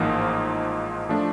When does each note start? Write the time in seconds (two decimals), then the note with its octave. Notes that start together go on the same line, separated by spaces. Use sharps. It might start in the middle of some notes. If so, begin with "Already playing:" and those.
Already playing: A1 G#2 F3 A#3 D#4
1.09 F3 A3 D4